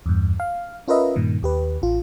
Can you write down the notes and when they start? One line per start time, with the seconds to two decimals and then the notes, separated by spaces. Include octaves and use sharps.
0.06 E2 G2
0.40 F5
0.88 C#4 F4 A#4 B4 D#5 E5
1.16 G2 A#2 D#3
1.43 D#2 G4 B4
1.82 A1 F4